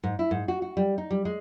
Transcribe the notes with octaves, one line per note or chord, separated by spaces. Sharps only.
G#2
E4
G#2
F#4
F#4
G3
D#4
G3
G#3